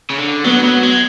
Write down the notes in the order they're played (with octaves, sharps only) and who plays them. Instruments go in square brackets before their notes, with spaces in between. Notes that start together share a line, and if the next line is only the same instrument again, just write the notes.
[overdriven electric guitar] C#3
D3
[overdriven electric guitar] F#3 [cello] B3
[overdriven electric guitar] F#3
G#3